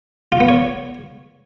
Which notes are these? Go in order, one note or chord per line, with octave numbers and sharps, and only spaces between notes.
F4
B3
C#5